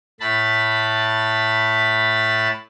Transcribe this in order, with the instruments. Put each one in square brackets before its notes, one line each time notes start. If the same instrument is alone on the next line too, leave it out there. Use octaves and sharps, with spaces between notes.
[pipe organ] A2 A5 B5